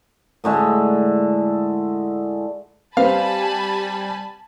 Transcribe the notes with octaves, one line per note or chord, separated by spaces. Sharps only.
A2 D3 G#3 E5
G3 C4 B4 F5 G#5 A5 B5